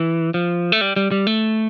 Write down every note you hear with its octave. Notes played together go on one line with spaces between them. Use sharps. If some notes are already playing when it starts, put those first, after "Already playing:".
Already playing: E3
F3
A3
G3
G3
G3
A3